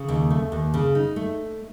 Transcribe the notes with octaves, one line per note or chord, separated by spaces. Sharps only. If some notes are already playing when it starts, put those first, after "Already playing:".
Already playing: C#3
D#2
A3
D#2
C#3
D#4
A3